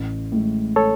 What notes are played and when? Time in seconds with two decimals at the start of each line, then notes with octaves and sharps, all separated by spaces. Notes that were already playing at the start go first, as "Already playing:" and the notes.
Already playing: A1
0.32 A2 G#3
0.76 A4 C#5